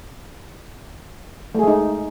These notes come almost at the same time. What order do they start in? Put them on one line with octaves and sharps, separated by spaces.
A3 G#4 G#3 D#4